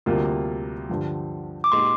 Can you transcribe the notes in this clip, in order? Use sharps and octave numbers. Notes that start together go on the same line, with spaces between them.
D2 C3 G3 A#3 F4
G2 D3 F3
D6
A#2 G#3 D#4 G4 C6